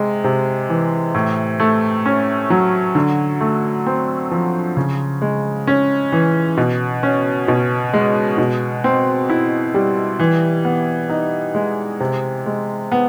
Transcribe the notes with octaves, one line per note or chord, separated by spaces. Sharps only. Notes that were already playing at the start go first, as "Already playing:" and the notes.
Already playing: C3 G#3
C3
E3
A2
A3
C#4
F#3
D3
A3
C4
F3
C#3
G#3
C#4
E3
B2
C#4
B2
G#3
B2
C4
E4
G3
E3
B3
D#4
G#3
C3
G#3
B3